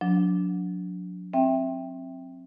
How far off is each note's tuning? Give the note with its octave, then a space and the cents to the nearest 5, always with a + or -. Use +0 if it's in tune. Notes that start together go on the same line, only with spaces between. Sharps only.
F#3 -40 D4 -20
C4 +15 E5 +0 G5 +0